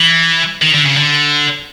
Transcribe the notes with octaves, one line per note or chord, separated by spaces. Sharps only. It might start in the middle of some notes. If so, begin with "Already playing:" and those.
Already playing: E3
D#3
D3
C#3
D3